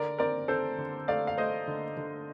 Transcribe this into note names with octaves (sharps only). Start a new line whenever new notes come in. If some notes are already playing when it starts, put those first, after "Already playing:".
Already playing: D3 A#4 D5
C4 A#4 D5
C4 A4 C5
D3
A3 D5 F5
F5
A3 C5 D#5
D3
D3